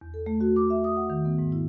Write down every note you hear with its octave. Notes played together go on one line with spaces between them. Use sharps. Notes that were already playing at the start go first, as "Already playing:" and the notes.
E2
A4
A3
F#4
D6
E5
D#6
F#5
D#3
B3
G#2
E4